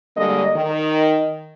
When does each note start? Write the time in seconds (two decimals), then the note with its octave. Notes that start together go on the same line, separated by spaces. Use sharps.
0.17 D3 G3 G#3 A#3 D#5
0.56 D#3